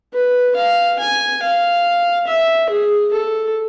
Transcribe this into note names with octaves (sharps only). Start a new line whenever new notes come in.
B4
F5
G#5
F5
E5
G#4
A4